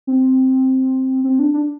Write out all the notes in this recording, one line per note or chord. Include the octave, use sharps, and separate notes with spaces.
C4
C4
D4
D4